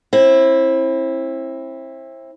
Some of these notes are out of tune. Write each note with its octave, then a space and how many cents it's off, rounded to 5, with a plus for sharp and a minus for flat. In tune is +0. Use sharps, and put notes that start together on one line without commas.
C4 +35 E4 +0